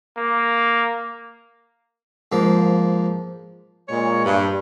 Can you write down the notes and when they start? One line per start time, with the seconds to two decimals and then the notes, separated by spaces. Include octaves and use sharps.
0.17 A#3
2.32 G#2 F3 A#3
3.89 A#2 G#3 C#5
4.25 G2